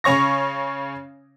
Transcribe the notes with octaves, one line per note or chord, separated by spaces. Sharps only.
C#3 C#4 C#5 C#6 A#6